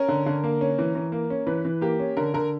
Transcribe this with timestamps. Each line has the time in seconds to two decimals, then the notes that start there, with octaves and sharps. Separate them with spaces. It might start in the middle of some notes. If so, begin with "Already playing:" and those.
Already playing: C#4 A#4
0.08 D3
0.26 D3
0.44 A#3
0.61 C#4
0.79 E3
0.95 E3
1.12 A#3
1.30 C#4
1.47 E3 B4
1.65 E3
1.81 A#3 G4
2.00 C#4
2.17 D3 A#4
2.34 D3 A#4